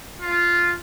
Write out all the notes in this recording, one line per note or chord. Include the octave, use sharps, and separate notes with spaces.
F4